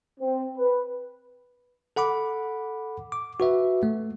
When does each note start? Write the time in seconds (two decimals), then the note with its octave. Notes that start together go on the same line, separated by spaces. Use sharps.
0.20 C4
0.57 B4
1.96 A4 F#5 B5 D6
3.12 D6
3.40 F#4 B4 E5
3.83 A3